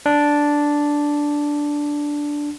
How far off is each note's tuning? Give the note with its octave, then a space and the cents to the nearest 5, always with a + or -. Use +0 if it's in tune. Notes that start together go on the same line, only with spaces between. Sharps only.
D4 -5